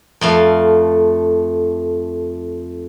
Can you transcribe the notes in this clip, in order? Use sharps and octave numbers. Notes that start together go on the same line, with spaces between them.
F2 A3 F5